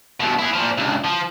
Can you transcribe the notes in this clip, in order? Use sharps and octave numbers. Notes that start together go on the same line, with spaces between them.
G2 B2
E4 G#4
A#2 F3
C#2 G2
F3